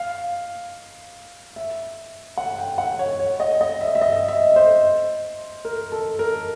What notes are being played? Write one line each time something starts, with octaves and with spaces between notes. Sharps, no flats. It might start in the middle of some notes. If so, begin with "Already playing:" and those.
Already playing: F5
E5
F#5
G5
F#5
C#5
C#5
D#5
D#5
E5
E5
D#5
E5
C5
A#4
A4
A#4